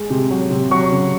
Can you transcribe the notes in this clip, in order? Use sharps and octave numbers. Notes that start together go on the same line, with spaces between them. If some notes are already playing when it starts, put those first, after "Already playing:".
Already playing: G#3
C3
F#3
C3
F#3 C#6
C#3